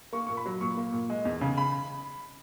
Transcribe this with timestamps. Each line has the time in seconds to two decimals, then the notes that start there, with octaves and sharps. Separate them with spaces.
0.13 A#3 C#6
0.27 A#2 C#6
0.37 B5
0.46 F#3
0.61 A#2 C#6
0.77 A#3
0.93 A#2
1.10 G#3
1.25 E2
1.41 C#3
1.58 B5